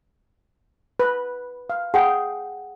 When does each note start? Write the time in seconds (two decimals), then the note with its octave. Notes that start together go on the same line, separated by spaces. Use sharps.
1.00 B4
1.70 F5
1.94 G#4 F#5 G5